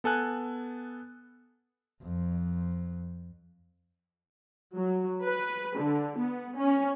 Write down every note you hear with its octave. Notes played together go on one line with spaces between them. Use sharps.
B3 A4 G#5 F#6
F2
F#3
B4
D3
B3
C#4